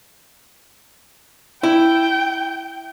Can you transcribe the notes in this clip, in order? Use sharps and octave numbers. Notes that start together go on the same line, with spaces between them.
E4 G5